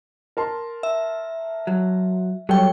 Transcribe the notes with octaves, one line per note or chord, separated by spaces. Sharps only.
A#4 A5 C6
E5
F#3
F#3 G3 A4 C#5 G5